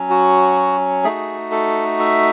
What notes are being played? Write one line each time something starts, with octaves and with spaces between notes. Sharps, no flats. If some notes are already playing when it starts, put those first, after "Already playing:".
Already playing: F#3 C#4
F#4
A3 D#4 F#4 G#4
A4
E5